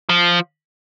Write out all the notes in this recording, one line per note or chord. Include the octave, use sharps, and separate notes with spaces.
F3